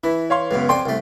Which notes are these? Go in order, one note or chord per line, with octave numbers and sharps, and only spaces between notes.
E3 E4
C#5 F5 C6
C#2 F#2 B2
F2 D5 G5 G#5 C6
C2 A3